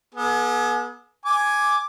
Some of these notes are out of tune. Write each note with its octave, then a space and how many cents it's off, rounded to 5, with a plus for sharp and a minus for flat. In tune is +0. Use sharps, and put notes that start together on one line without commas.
B3 -35 G#4 +30
G#5 +5 D6 +0